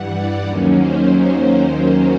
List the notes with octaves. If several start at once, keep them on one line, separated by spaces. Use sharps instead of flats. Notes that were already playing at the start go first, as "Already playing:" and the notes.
Already playing: G2 E3 G3 F#5
D5
D#2 D#3 F#3 A#3 C#4
C5